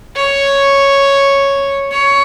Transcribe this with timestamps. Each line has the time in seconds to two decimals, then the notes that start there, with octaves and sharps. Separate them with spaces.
0.16 C#5
1.92 C#5